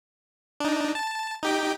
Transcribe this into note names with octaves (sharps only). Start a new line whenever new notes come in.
D4 D#4
A5
D#4 G4 G5